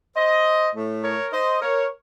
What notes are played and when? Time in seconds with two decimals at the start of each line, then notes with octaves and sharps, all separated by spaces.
0.16 C5 D#5
0.75 A2 A3
1.03 A#4 C#5
1.32 C5 D#5
1.62 A#4 C#5